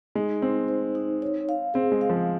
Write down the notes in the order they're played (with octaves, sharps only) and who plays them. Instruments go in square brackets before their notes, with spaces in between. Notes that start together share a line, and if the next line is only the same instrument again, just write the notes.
[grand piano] G#3 [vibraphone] D#4
[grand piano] C4 [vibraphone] D#4
[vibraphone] C5
D#4
C#5
F5
[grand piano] C4 [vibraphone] G#4
[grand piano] G#3
[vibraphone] F5
[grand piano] F3